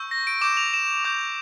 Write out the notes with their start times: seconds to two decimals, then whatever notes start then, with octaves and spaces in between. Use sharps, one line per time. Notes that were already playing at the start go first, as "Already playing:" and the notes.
Already playing: C#6 E6 G6
0.11 A#6
0.27 D7
0.41 D6 G6 E7
0.57 F7
0.74 E7
1.04 D6 G6